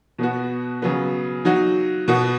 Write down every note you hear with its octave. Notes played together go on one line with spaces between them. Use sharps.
B2 B3 F#4
C#3 F#3 B3
F#3 D#4 F#4
B2 B3 F#4